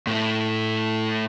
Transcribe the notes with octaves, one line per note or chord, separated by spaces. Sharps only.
A2 A3